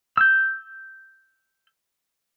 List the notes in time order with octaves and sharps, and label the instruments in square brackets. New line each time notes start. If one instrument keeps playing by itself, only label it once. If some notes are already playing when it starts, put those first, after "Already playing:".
[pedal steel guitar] E6 G6